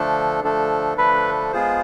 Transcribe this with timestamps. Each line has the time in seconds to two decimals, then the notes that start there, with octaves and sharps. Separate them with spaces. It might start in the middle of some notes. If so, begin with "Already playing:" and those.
Already playing: D3 F3 A3 D4 A4
0.43 D3 F3 A3 D4 A4
0.97 D3 F3 A3 D4 A4 B4
1.52 G#3 B3 F4 G#4 C5